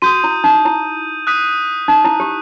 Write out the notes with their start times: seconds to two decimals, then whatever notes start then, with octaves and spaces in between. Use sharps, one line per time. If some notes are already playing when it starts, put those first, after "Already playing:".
0.02 F#4 D#6 G6 D#7
0.24 E4
0.44 D#4
0.65 E4
1.27 D#6 F#6 B6 D#7
1.88 D#4
2.05 E4
2.20 G4